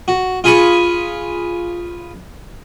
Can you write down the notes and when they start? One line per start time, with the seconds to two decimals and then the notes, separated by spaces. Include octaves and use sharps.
0.08 F#4
0.44 F4 G#4 G#5 B5 C#6